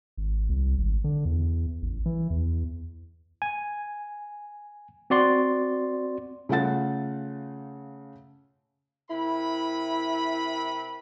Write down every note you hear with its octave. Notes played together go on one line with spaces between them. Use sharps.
G#1
C2
G#1
D3
E2
A1
E3
E2
G#5
C4 F#4 D5 C6
C#3 A3 F4 F#5 A6
C3 E4 A#4 B5